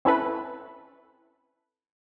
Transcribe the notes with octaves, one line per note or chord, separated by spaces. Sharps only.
C4 C#4 E4 A4 B4